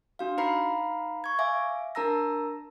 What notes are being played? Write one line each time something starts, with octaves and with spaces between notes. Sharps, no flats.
D4 F#4 F5
D#4 B4 F5 A#5 B5 C7
C#6 G#6
E5 F5 G#5 D6
D4 A#4 A5 A#5 E6 A#6